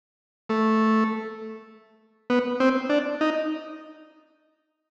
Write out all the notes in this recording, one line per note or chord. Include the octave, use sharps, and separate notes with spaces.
A3
B3
C4
D4
D#4